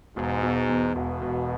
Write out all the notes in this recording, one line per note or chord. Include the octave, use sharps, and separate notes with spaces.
E1 G#2
B2
E2
E1 B2
E1